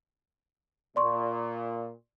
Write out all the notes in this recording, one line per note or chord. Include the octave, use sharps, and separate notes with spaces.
A#2 D5 C6 C#6